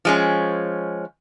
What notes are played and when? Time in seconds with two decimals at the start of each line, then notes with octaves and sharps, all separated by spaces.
0.05 F3 G#3 C#4